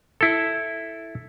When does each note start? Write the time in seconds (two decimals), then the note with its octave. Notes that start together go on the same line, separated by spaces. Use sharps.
0.21 E4 A4